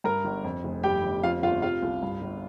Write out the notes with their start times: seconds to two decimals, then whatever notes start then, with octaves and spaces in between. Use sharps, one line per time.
0.04 G2 A#4 A#5
0.25 G1
0.44 F2
0.64 F1
0.83 G2 G4 G5
1.03 G1
1.23 F2 F4 F5
1.43 G1 F4 F5
1.62 C3 F4 F5
1.83 C2
2.03 G2
2.22 G1